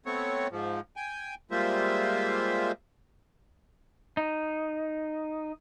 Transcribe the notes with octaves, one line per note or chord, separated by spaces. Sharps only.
A3 B3 C4 C#5
G#2 F3
G5 G#5
G3 G#3 A#3 F4 C5 E5
D#4